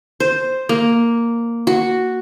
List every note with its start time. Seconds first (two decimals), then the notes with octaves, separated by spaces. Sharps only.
0.20 C5
0.69 A#3
1.67 F#4